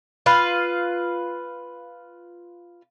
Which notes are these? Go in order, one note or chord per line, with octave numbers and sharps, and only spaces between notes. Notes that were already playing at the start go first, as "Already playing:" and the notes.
F4 B4 F5